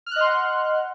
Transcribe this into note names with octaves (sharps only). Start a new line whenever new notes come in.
D#5 F#5 C6 F6 F#6